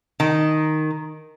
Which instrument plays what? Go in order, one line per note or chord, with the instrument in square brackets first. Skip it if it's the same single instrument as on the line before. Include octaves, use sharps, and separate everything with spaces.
[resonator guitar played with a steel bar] D#3